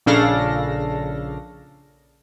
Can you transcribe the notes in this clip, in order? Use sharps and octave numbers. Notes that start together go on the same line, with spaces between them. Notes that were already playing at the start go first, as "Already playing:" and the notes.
A#1 C#3 D4 A4 F5 A#6